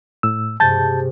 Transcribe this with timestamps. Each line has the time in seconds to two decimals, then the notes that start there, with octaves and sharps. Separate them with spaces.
0.23 A2 E6
0.60 G2 C3 G#3 A5 G6 A6